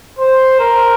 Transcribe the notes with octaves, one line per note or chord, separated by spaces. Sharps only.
C5
A#4